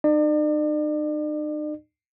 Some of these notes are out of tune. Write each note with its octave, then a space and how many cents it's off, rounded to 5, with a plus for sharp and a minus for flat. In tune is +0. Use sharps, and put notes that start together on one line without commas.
D#4 -40 D5 +40